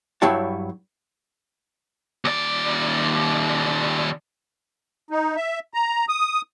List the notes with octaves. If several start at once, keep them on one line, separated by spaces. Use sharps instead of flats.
G2 F#3 E4 C#5 G5 A5
D#2 D5
D#4
E5
A#5
D#6